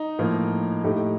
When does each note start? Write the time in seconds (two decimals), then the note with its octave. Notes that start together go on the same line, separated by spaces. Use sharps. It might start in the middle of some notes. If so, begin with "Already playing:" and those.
Already playing: D#4
0.19 A2 F3 A#3
0.84 A2 A3 D#4 G4